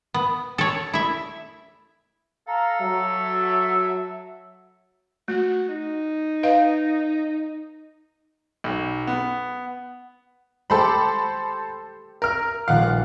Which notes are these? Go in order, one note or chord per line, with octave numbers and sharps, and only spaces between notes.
B3
A4 C#5
E4 E5
A4 F5 A#5
F#3 E5
A3 F#4
D#4
B4 D#5 F5
B1
B3
A3 G4 A4 C5 G5 B5
A#4 F6
D#1 A#1 F5 F#5